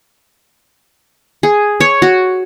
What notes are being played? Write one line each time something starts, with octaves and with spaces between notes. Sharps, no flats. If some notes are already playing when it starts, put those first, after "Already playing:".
G#4
C#5
F#4